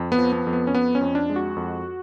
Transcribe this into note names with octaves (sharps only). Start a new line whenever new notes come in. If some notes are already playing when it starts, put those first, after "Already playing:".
Already playing: F2
B3
F3
B3
F2
B3
C#4
F2 B3
C#4
F2
D4
G#3
F#4
F2